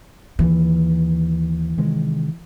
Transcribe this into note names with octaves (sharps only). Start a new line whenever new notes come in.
D#2 E3
C3 D#3 G#3